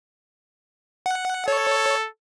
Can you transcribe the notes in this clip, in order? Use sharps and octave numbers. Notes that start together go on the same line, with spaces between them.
F#5
A4 C#5